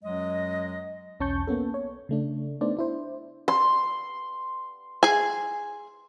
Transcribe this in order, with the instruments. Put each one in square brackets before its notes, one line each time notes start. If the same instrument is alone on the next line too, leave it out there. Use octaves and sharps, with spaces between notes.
[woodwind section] F#2 F#3 G#3 D#5
[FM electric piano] B1 E2 C#4 A5 C#6 G6
A#3 B3 C#4 A4
C#5
C#3 A3 D4
A3 B3 D4 D#4 C5 D5
D4 E4 C5
[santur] C6
[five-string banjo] G#4 G#5